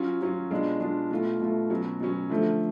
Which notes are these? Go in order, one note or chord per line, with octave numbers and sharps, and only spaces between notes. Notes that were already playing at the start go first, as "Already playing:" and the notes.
Already playing: F#3 C#4 F4
F#3 C#4 F4
B2 G#3 D4 F4
B2 G#3 D4 F4
B2 A3 F4
B2 A3 F4
B2 F#3 C#4
B2 F#3 C#4
D3 F3 A3